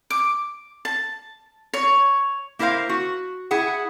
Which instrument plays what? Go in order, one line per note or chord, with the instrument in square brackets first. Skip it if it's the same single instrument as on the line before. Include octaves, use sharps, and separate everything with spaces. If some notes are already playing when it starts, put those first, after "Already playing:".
[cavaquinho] D6
A5
C#5
[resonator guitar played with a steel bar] A#3 E4 A#4 C5 F5
F#4
E4 G#4 F#5